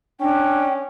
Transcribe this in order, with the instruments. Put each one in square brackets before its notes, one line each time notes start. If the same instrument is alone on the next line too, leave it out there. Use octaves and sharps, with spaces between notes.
[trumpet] C#4 [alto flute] D4 [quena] G5